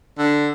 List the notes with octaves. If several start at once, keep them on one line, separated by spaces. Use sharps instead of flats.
D3